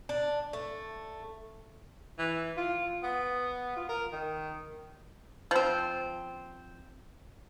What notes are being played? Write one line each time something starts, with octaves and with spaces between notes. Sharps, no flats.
D4
A3
E3
F4
B3
F4
A#4
D#3
F3 C4